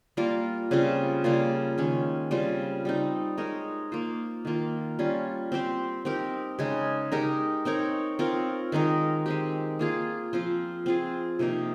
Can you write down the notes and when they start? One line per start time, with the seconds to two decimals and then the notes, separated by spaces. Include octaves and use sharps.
0.17 G3 A#3 F4 A#4
0.71 C#3 G3 C4 F4
1.24 C#3 G3 A#3 F4
1.78 D#3 G#3 C#4
2.31 C#3 G3 C4 F4
2.85 G3 C4 D#4
3.37 G#3 D#4 A#4 C#5
3.92 A#3 F4 C5
4.45 D#3 A#3 F4
4.99 G3 C#4 F4
5.52 C4 G4 C5
6.05 C4 D#4 G4 A#4
6.59 C#3 G#3 D#4
7.12 G#3 D#4 G4 A#4
7.65 C4 D#4 A#4 C#5
8.19 C4 F4 A#4 C#5
8.72 D#3 G#3 D#4 A#4
9.26 G#3 C4 G4
9.79 A#3 F4 G#4
10.33 F3 C4 F4 C5
10.86 C4 F4 G#4
11.39 C3 F3 A#3 D#4